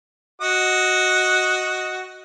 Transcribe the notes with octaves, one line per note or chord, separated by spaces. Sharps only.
F#4 D#5 D#6